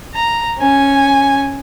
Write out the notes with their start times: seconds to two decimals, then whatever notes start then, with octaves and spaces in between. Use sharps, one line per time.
0.14 A#5
0.58 C#4 G#5